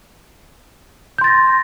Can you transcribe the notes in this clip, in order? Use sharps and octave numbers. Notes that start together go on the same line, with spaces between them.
C6 G6 A6 A#6